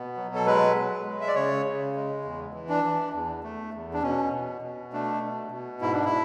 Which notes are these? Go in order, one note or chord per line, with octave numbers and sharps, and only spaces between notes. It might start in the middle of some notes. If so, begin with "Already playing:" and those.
Already playing: B2 B3
F#3
A4
G#3 B4
G#3
G#3
E5
D5
C#3 C#5
C#3
G#3
E2
E3
D4
E3
E2
A3
E2
D4
B2 C#4
B2
B2
A3 D4
B2
B2
G#2 E4
D4
E4